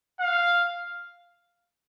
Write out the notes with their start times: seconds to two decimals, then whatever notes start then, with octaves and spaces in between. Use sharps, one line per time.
0.21 F5